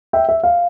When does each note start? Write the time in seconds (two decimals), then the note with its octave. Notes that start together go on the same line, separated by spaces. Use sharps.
0.13 E5 G5
0.29 E5
0.43 F5